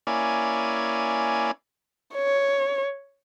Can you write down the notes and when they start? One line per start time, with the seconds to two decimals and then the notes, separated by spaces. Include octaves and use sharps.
0.07 A#3 C#4 E4 D5 G#5
2.15 C#5